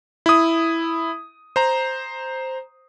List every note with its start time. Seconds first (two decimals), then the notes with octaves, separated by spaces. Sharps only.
0.26 E4 D#6
1.56 C5 A#5